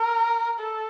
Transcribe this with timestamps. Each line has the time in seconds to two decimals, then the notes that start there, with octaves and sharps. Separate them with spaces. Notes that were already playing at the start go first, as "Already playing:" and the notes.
Already playing: A#4
0.59 A4